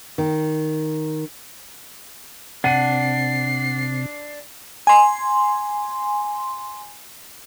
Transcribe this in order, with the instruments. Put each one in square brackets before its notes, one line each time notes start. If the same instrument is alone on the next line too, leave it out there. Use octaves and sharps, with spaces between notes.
[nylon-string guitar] D#3
[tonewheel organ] C3 [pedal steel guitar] D4 [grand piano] F#5 D#7 [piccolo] C7
[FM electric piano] G#5 C6